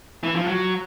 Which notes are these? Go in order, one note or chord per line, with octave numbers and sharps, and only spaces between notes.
E3
F3
F#3